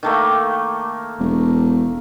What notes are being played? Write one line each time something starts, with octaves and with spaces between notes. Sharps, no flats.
D#3 A3 A#3
E1